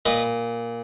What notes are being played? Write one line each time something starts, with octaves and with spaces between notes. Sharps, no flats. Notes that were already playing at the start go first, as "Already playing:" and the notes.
A#2 B4 D#5